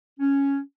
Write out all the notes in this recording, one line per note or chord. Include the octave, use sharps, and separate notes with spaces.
C#4